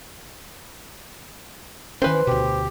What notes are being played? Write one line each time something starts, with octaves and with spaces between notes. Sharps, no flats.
D#3 E3 C#4 B4 C5
D2 B2 G4